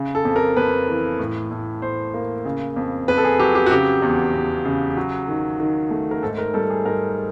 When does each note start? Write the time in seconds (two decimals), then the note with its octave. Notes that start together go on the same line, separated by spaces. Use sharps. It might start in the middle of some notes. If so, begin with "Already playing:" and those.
Already playing: C#3
0.15 A4
0.25 F2
0.36 A#4
0.56 F2 B4
0.88 E3
1.19 A2
1.51 A2
1.82 A2 C5
2.14 A#3
2.45 C#3
2.76 F2
3.08 F2 B4
3.18 A4
3.24 G#4
3.39 F#3 G4
3.55 G4
3.66 F#4
3.71 C#3 G4
4.02 E2
4.34 E2
4.65 C#3
4.96 F#3
5.28 D#3
5.60 D#3
5.90 A3
6.11 A#4
6.23 G#2 A4
6.38 A#4
6.54 G3 A4
6.70 G#4
6.85 G#2 A#4